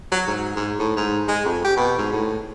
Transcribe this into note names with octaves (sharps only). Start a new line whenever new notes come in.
F#3
G#2
G#2
A2
G#2
G#3
F2
G4
B2
G#2
A2